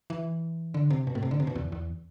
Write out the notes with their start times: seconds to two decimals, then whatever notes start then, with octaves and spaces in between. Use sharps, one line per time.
0.10 E3
0.74 D3
0.90 C3
1.07 B2
1.15 A2
1.22 C3
1.31 D3
1.40 C3
1.47 B2
1.55 E2
1.72 E2